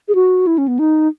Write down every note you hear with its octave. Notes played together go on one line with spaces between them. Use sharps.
G#4
F#4
E4
C#4
B3
D#4